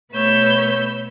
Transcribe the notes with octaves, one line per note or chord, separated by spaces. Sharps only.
B2 A3 B4 C#5 E6 G6